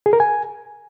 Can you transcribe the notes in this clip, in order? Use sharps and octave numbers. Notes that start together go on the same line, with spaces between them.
G#4
A#4
G#5